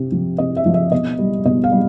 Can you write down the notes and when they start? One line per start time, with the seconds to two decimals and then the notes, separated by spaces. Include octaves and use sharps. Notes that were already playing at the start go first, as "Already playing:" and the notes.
Already playing: C3
0.12 F3
0.38 C3 D#5
0.57 E5
0.66 F3
0.74 E5
0.92 B2 D#5
1.18 G3
1.45 B2 D#5
1.64 F5
1.72 G3